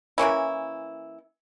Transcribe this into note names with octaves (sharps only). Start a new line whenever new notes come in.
E3 A#3 C#4 E4